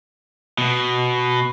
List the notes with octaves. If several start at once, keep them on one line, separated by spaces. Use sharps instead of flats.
B2